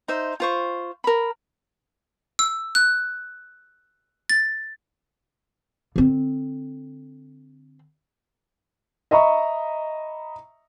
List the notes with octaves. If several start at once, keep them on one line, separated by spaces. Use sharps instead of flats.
D#4 C5 E5
F4 C5 C#6
A#4 B5
E6
F#6
A6
D3 C4
D#5 E5 A#5 B5 C#6